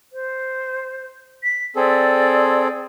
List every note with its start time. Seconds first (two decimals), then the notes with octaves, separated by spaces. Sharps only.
0.12 C5
1.43 B6
1.76 C4 G#4 A4 D5